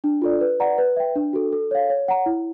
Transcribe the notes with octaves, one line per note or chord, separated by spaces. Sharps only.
D4
F4 A4 D5
B4
D5 F#5 A#5
B4
E5 G5
D4
F#4 A4
A4
C#5 F5
C#5
F#5 A#5
E4